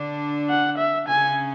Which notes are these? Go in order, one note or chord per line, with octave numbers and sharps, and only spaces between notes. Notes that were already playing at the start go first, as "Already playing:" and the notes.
Already playing: D3 D4
F#5
E5
C#3 C#4 G#5